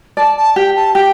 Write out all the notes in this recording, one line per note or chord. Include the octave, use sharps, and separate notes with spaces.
D5 A5
A5
G4 G5
A5
G4 G5